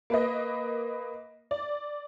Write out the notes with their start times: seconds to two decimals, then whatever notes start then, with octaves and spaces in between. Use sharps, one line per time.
0.10 A#3 B4 D#5
1.51 D5